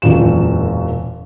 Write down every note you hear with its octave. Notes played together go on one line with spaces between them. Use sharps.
E1 F#2 A#2 E7